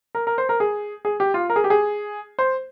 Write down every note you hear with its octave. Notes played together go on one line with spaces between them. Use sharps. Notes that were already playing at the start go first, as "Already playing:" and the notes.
A#4
A#4
C5
A#4
G#4
G#4
G4
F4
A#4
G#4
G4
G#4
C5